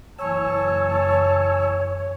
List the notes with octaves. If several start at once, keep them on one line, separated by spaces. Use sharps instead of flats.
F#1 E3 C#5 G#5 A5 E6